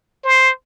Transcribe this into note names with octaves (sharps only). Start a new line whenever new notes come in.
C5